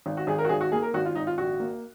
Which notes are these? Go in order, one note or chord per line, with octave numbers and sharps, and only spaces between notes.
G#1
F#4
G#1 G#4
A#4
F#4
G#1 G#4
F#4
A#3 G#4
A#4
G#1 F#4
F4
G#1 D#4
F4
A#1 F#4
A#3